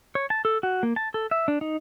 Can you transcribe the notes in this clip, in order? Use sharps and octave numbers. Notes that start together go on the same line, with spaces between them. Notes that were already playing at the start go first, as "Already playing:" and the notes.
C#5
A5
A4
F#4
A#3
A5
A4
E5
D4
D#4